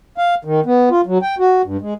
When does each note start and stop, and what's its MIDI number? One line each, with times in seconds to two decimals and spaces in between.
0.18 0.35 77
0.45 0.60 51
0.66 0.89 59
0.91 1.01 65
1.06 1.18 54
1.22 1.35 79
1.39 1.62 66
1.65 1.77 43
1.81 1.94 56